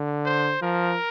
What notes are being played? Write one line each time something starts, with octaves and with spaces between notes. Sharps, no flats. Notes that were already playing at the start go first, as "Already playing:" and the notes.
Already playing: D3
C5
F3 A#4